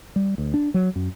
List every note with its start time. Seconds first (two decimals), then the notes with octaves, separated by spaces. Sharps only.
0.16 G3
0.38 D2
0.54 D4
0.74 F#3
0.96 F#2